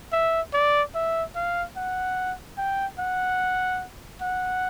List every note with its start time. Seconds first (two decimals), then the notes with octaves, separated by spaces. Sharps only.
0.12 E5
0.54 D5
0.95 E5
1.36 F5
1.76 F#5
2.58 G5
2.99 F#5
4.22 F#5